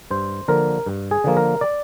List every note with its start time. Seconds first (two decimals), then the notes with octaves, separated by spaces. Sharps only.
0.11 G2 C5
0.48 D3 F3 A#3 A#4
0.86 G2
1.11 G#4
1.24 D3 F3 A#3
1.37 A#4
1.61 D5